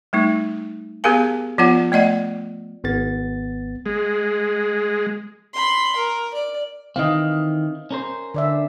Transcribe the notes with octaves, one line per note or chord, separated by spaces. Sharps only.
G3 A3 D#4
B3 G4 G#4 A#4 F5 G#5
F3 B3 F4 C#5 F#5
A3 D5 D#5 F#5
G#1 B3 A6
G#3
B5 C6
A#4
D5
D#3 E3 C4 D#5 F5
C#4 A#4 C5
D3 D5 E5